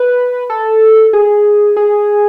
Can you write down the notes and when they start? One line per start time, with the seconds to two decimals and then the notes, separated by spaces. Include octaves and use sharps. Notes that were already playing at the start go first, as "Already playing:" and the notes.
Already playing: B4
0.50 A4
1.13 G#4
1.76 G#4